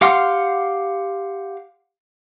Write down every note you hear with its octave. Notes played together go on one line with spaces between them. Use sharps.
G4 F5 F#5 C6 F6